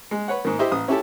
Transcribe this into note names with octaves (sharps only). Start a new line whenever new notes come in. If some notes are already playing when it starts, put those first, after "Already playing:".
G#3
B4 C#5 F#5
G#2 D#3
E4 G4 C5 D#5 E5
A1 D#6
C#4 E4 F4 G4 A4 A5